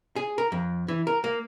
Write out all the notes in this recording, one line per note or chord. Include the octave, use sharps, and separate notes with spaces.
G#4
A#4
F2
E3
A#4
A#3